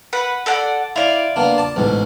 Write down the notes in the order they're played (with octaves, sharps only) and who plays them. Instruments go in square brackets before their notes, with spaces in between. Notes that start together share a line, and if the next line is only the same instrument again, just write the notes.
[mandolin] B4 F#5
A4 D5 F#5
[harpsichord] E4 [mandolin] F4 D5
[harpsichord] A#3 B3 D4
A5 D6
A1 G#2 B2